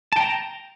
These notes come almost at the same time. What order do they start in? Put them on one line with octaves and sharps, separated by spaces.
A5 G5 A#5